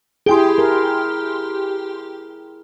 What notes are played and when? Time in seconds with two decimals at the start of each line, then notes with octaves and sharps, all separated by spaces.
0.26 E4 G4 G#4 G5 C6
0.58 A#4